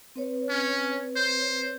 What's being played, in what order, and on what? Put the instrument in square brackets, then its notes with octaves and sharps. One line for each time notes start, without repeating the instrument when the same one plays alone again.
[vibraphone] C4 B4 C#5
[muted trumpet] C#4
C5